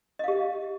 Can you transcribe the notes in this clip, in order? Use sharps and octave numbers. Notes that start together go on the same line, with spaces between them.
G4 D#5 F5